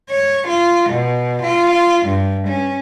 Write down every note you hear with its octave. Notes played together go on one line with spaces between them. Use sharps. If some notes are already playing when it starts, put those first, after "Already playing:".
C#5
F4
B2
F4
G2
C#4